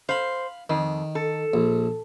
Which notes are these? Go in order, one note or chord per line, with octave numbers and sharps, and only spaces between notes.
C5 F5 B5
F2 D#3
A4
A#1